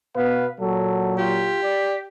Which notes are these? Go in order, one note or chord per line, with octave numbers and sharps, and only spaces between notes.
B2 B3 B4 F5
A#2 F#3 A4
F4 G4
D5